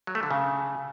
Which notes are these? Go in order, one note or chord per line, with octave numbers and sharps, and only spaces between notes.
F#3
A3
D3
C#3